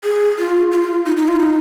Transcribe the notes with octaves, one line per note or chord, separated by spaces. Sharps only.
G#4
F4
F4
D#4
D#4
F4
D#4